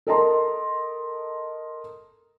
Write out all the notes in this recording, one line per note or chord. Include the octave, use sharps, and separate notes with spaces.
A4 A#4 D#5 A5 A#5 C6